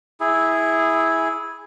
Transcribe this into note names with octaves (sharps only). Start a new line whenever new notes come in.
E4 G#4